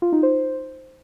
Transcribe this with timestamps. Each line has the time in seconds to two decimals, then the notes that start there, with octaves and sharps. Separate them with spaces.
0.02 F4
0.13 D#4
0.23 C5